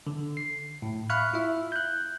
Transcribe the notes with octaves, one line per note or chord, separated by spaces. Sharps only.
D3
C7
A2
E5 F5 B5 C#6 F6 F#6
E4 F4 E5
F#6 G6